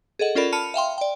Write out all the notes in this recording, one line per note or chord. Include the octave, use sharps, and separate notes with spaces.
G#4 A4 D#5 F#5
C#4 F4 A4 A#4 D5 B5
A5 B5 F6 C#7 D#7 F7
E5 F5 G5 C6
D5 G5